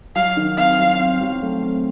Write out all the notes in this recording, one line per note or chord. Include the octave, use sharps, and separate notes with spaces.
F#3 F5
D#3
C4 F5
F#3
C4
F#3
A3
C4